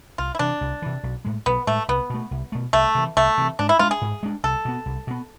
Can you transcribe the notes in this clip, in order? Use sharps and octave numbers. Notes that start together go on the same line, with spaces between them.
C2 F4
E4
C3 E3 D4
C2
C3 E3
B1
A2 G#3
B1 B3
A2 G#3 A3
C2 B3
B2 A3
C2
B2 A3
C2 A3
C3 E3
C2 A3
C3 E3
G#2 D4
E4
G#3 D4 F4
G#4
G#2
G#3 D4
C2 A4
B2 B3
C2
B2 B3